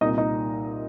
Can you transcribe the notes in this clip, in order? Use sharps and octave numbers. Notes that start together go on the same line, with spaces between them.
C2 A#2 D#4 D#5
D#4 D#5